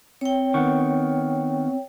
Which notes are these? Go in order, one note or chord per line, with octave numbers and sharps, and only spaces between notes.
C4 C#5 G5
D#3 B3 F#5 C#6